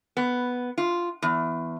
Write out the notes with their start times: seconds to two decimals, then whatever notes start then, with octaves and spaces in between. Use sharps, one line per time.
0.17 B3
0.78 F4
1.22 E2